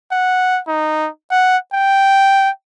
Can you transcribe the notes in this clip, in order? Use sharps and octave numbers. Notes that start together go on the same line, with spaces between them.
F#5
D#4
F#5
G5